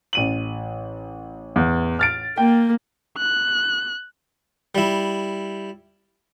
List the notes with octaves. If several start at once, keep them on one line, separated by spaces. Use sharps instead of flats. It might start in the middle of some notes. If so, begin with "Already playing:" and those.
A1 D#7 F#7
E2
F6 A6 D7
A#3 G5
F#6
G3 E4